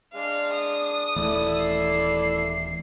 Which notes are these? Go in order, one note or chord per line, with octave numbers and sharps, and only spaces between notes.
G#3 D4 F5
D#6
D#1 E3 A3 E4 A4 D5
C7